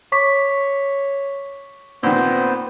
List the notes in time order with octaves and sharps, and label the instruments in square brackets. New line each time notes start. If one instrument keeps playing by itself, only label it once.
[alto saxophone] C#5 [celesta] C#6 D6 B6
[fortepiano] A#2 D#3 [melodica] B3 C5 [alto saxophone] C4